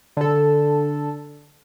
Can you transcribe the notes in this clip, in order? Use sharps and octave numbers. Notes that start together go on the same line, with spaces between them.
D3 A4